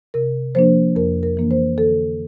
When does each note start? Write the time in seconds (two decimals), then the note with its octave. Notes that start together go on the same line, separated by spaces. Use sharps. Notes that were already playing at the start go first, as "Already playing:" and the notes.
0.14 C3 A#4
0.55 F3 A#3 D4 C5
0.96 F2 A#4
1.23 A#4
1.37 E3 A#3 D4
1.51 C5
1.78 D3 A4